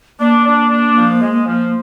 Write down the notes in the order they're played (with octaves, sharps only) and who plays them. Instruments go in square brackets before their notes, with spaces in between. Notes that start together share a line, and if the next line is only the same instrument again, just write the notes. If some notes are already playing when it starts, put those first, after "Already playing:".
[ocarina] A#3 [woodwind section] D4
[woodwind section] D4
D4
F3
G#3
F3